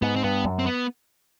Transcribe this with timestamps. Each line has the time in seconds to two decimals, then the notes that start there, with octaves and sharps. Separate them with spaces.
0.02 G#2 B3
0.16 C4
0.24 G2 B3
0.45 F#2
0.59 C4
0.66 B3